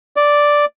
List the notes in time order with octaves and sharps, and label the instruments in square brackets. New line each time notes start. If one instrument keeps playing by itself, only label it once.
[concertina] D5